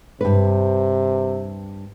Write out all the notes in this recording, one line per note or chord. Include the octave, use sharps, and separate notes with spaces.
G2 C3 B4